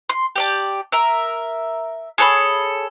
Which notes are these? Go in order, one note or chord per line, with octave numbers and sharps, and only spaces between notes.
C6
G4 D5 A5
A#4 E5
G#4 A4 C#5 B5